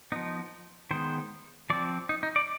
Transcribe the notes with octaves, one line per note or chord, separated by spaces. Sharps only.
F3 B3 D#4
D#3 G#3 B3 C5
F3 C4 D5
D#4
D#4
D5